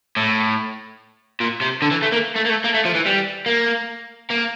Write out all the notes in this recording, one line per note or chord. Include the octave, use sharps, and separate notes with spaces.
A2
A#2
C3
D3
E3
A3
A#3
A3
A#3
A3
A#3
A3
F3
E3
G3
A#3
A#3